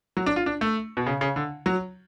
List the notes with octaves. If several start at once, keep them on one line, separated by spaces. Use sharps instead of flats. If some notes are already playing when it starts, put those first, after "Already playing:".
F#3
D4
F4
D4
A3
B2
C#3
C#3
D3
F#3